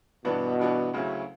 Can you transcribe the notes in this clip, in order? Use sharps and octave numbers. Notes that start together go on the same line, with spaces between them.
G2 B2 E3 B3 D4 F#4
G2 E3 B3 D4 F#4
D2 C#3 F#3 C#4 E4